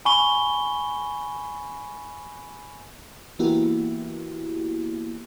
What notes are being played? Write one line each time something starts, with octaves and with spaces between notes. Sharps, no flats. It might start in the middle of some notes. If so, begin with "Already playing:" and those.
G#5 B5 C#6 G7
E3 A#3 B3 E4 F#4 G4